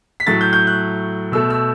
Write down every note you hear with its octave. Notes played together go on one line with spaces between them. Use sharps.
B6
A2 F#3 A3 A6
G6
G6
F#6
B2 A3 E6
E6